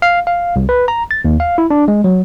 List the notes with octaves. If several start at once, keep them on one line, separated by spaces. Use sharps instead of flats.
F5
F5
C2
B4
A#5
A6
D#2
F5
E4
D4
G#3
F#3